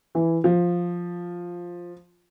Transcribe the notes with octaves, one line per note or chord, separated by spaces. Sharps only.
E3 E4
F3 F4